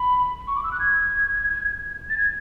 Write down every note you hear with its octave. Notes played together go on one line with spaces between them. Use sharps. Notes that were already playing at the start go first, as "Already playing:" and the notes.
Already playing: B5
C#6
D6
E6
F#6
G#6
A6
G#6